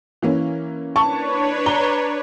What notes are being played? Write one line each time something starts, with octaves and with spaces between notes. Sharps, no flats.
E3 A#3 C#4
D4 B4 C#5 A5 C#6
A#5 G7